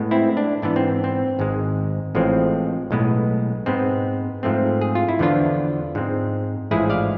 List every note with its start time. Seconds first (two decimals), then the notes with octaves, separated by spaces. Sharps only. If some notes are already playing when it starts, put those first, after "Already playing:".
Already playing: A2 G#3 B3
0.11 C4 E4
0.37 D4
0.62 G#2 E3 B3 D4
0.76 C4
1.04 C4
1.39 G#1 G#2 G#3
2.15 A1 A2 F3 G#3 C4
2.91 B1 A2 G#3 B3
3.66 G#2 G#3 B3 C4
4.43 G#2 F3 A3 C4
4.81 G#4
4.95 F4
5.09 E4
5.19 E2 D3 F3 B3 D4 F4
5.95 G#2 G#3 C4
6.71 A1 G#2 F3 G#3 E4 G#4
6.90 D5 F5